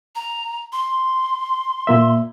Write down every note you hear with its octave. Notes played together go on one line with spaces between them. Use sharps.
A#5
C6
A#2 A#3 E5